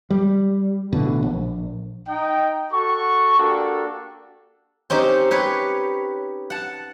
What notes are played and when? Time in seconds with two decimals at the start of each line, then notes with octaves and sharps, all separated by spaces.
0.10 G3
0.93 A1 B2 D3
1.23 A#1
2.07 D#4 D#5 G5
2.72 F#4 A4 C#6
3.38 A#3 D4 F#4 G4 A4
4.90 C4 C#4 D#4 G4
5.31 G4 B4 C#5
6.50 F#5 A5